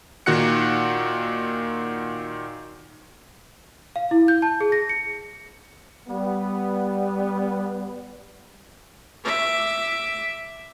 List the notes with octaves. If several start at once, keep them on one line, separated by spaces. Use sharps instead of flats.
A#2 D#3 F#4 F#5 F#6 C#7
F5
E4
G6
A5
G#4
A#6
C#7
G3 B3
E5 D6